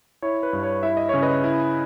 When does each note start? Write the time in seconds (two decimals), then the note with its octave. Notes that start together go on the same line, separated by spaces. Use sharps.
0.22 E4 C#5
0.43 B4
0.53 G2
0.63 C#5
0.83 E4 E5
0.97 D#5
1.09 C#3 C#5
1.22 B4 D#5
1.44 E4